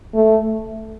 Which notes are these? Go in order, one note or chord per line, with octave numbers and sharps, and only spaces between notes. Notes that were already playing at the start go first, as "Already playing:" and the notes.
A3